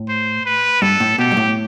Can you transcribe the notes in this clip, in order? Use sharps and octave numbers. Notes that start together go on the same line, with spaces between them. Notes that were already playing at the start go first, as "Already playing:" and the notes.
Already playing: A2
C5
B4
G2 A4
A2
B2 G4
G2
A2